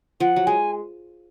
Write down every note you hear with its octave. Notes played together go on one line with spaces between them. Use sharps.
F3 F#5
F#3
G#3 G#5